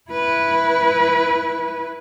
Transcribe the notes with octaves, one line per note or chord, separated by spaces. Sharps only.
E4 B4